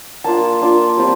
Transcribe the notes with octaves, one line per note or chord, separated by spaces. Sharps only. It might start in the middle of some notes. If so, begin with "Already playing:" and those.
A#3 D4 F4 A5
A#3 D4 F4
G3 C4 F4